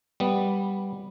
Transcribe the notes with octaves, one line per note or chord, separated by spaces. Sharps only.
G3 B3